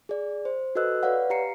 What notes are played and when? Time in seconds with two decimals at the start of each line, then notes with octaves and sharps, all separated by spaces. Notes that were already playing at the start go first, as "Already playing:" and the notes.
0.09 G#4 D5
0.45 C5
0.75 F#4 A4 B4 D#5 E6 F#6
1.03 B4 C#5 D5 F5 F#5
1.30 G4 F5 A#5 C7 C#7